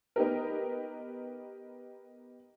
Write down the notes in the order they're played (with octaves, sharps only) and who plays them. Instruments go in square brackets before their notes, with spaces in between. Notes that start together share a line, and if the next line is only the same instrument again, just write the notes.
[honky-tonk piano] B3 D#4 G4 A#4